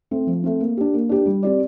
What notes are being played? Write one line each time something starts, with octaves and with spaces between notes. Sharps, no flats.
A3 C4
F3
A3 C4
A#3
D4 G4
A#3
D4 G4
G3
C4 G4 D5